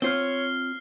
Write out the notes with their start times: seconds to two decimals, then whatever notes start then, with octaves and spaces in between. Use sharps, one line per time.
0.02 C4 F4 C5 C#5 F6 C7 G7